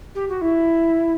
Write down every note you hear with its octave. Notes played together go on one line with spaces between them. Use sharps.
G4
F#4
E4